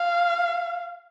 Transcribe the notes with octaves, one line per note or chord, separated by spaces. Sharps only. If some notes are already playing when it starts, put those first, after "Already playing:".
Already playing: F5